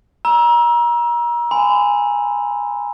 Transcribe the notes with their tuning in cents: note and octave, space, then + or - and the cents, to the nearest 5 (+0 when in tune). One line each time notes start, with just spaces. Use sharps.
A#5 +30 E6 +0
G#5 -10 B5 +45